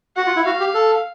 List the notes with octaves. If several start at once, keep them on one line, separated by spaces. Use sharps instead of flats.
F#4 F#5
F4
E4
F#4 F5
G4
A4